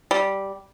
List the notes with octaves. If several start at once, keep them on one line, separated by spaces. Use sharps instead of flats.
G3